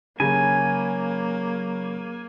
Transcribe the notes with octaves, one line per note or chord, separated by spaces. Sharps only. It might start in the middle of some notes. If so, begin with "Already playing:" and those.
C#3 F#3 A#3 G#5